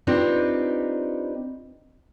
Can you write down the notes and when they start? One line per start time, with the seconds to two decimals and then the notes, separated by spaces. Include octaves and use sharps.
0.07 C4 D4 D#4 F4 G4 B4